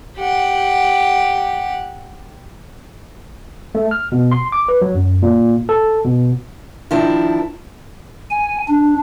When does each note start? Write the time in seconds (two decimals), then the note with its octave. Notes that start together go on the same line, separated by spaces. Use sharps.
0.17 G4 F#5
3.75 A3
3.91 F6
4.12 B2
4.32 C6
4.52 D6
4.68 B4
4.82 F#3
4.95 F#2
5.22 A#2
5.69 A4
6.04 B2
6.91 D#3 F3 D4 E4
8.30 G#5
8.68 D4